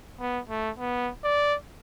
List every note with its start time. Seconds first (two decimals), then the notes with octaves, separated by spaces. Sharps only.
0.19 B3
0.49 A3
0.79 B3
1.24 D5